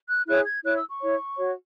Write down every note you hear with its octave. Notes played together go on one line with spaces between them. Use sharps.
F#6
E4 G#4 C#5 F#6
G#6
E4 C#5 F#6
E6
C#6
E4 C#5
F#4 C#5